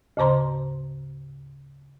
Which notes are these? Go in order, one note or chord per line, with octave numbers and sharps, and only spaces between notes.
D2 G#2 C#3 C5 A#5 C6